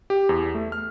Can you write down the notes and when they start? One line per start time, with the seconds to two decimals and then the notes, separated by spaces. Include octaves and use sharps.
0.10 G4
0.29 E2
0.54 A3
0.72 F6